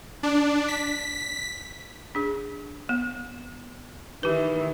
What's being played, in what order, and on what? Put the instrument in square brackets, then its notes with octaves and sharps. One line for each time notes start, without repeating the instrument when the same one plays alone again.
[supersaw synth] D4
B6
[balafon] D4 G#4
B3
[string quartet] D#3 E3 [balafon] G4 B4